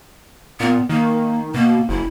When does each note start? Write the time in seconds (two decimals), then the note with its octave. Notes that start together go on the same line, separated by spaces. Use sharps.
0.60 A#2 B3
0.89 D#3 A#3
1.54 B2 A#3
1.89 F#1 E4